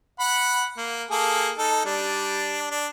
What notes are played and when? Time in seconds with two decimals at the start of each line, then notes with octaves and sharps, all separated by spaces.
0.20 F#5 B5
0.77 A#3
1.11 A#3 G#4 A4
1.58 D#4 A4
1.85 G3 D4
2.71 D4